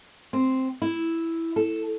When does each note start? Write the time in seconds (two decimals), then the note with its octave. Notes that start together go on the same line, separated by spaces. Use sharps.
0.33 C4
0.82 E4
1.56 A4